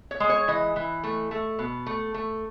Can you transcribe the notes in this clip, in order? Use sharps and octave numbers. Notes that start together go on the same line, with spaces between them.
C#5
G#3
C#5
E3 D#5
E3
A3
A3
B2
A3
A3